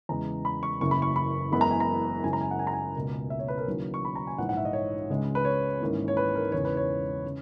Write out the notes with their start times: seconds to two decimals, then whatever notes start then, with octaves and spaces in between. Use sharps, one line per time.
0.09 E2 C#3 G#3 A#5
0.45 B5
0.63 C#6
0.81 F#1 F#2 C#3 E3 A#3 C#6
0.91 B5
1.02 C#6
1.16 B5
1.52 F#1 F#2 E3 G#3 B3 B5
1.61 A#5
1.70 G#5
1.80 A#5
2.23 F#2 C#3 G#3 C#4 E4 G#5
2.33 A#5
2.41 G#5
2.51 F#5
2.59 G#5
2.67 A#5
2.73 G#5
2.96 C#2 B2 A#3
3.30 E5
3.39 C#5
3.48 B4
3.58 A#4
3.66 D#2 C#3 F#3 A#3 E4
3.94 C#6
4.05 B5
4.16 A#5
4.27 G#5
4.38 A#1 G#2 E3 F#5
4.49 F#5
4.57 E5
4.65 D#5
4.73 C#5
5.10 C#2 C#3 G#3
5.35 B4
5.45 C#5
5.81 G#1 G#2 E3 A#3 C#4
6.08 C#5
6.17 B4
6.35 A#4
6.52 E1 E2 C#3 C#5
6.65 B4
6.77 C#5
7.26 C#3